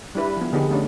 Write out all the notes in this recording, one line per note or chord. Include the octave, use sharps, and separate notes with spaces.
G3 D4 E4 B4
F3 B3
D3 B3 D#4 G4 G#4 B4
A3 B3 C#4 D4